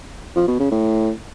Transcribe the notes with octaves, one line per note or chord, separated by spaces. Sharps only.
F3
B2
C#3
A2